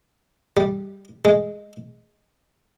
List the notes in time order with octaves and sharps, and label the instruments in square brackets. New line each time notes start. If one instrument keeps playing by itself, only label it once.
[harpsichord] G3
G#3